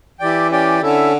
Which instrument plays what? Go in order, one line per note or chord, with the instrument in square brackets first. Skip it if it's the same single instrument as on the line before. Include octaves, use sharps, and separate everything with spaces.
[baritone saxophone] E3 [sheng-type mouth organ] E4 G4 D5 G5
[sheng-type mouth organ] C#4 G4 D5 G5
[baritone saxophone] D3 [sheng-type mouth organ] C#4 E4 A4 E5